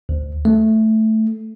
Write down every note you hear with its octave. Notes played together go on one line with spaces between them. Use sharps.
D2
A3